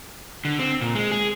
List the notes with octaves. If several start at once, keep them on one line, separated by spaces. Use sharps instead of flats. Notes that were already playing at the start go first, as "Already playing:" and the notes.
D3
C4
A#2
G#3
G#4